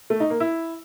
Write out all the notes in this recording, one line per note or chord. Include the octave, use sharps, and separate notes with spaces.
A3
D#4
A#3
E4